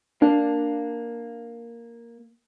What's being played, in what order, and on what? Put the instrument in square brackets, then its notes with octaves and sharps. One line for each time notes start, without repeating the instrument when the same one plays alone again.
[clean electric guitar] A#3 [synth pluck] D4